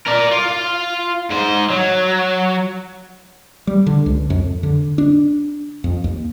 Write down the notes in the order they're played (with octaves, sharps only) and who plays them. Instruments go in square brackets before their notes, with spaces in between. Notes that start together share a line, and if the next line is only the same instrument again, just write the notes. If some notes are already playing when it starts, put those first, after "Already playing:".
[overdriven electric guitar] A#4 D5
F4
G#2 C5
F#3
[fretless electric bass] G3
D3
C#2
F2
D3
D4
F2
D#2